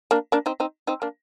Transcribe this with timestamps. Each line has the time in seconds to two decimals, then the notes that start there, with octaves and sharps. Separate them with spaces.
0.11 A#3 D4
0.32 A#3 D4
0.46 C4 D#4
0.60 C4 D#4
0.87 C4 D#4
1.02 A#3 D4